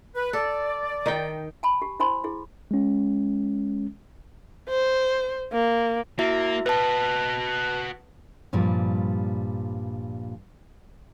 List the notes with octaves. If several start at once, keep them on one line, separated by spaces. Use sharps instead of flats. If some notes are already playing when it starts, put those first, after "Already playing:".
B4
A4 D5
D#3 D#4 G5
G#5 A5 B5
G4
E4 C5 G#5 B5 C6
E4 G#4
G#3 C#4
C5
A#3
A#3 E4 F#4 E5
F#4 B4 D#5 A5
G2 A#2 F3 G3